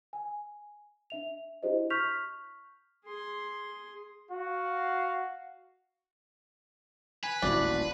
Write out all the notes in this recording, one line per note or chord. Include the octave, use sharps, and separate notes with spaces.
G#5
D4 E5 F7
D4 E4 F#4 G4 C5 D#5
C#6 F6 G6 B6 F7
G#4 C6
F#4 F5
B4 G#5
D#1 A1 A#2 D4 E4 F#4